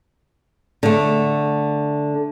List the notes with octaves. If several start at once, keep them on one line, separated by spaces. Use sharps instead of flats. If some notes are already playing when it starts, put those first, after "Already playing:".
D3 A3